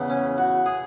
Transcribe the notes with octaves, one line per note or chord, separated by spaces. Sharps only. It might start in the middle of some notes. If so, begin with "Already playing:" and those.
Already playing: E2 C#3 E3
C#4
F#4
G#4